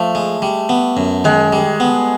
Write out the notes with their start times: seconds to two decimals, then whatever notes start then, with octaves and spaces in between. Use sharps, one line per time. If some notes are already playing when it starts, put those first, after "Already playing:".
Already playing: F3 A3
0.15 G#3
0.42 G3
0.69 B3
0.97 F#2
1.24 D#3 G#3
1.53 G3
1.80 B3